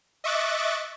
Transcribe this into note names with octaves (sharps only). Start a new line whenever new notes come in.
D#5 E5 C#6 D6 F#6 A6